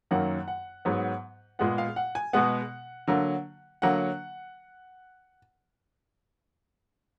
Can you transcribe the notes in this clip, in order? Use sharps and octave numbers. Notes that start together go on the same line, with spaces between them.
F#2 D#3 F#3 A#3 F#5
F#5
G#2 F#3 B3
A#2 G#3 B3 F#5
F5
F#5
G#5
B2 G#3 B3 F#5
D3 F#3 A#3
D3 F#3 A#3 F#5